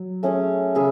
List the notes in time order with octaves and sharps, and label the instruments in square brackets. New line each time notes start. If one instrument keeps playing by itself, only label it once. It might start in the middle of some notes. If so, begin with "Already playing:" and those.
Already playing: [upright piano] F#3
[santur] A3 C#4 G#4 C#5
[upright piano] C#3 [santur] G#4 C#5 E5